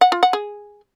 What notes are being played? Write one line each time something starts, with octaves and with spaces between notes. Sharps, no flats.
F#5
F4
F#5
G#4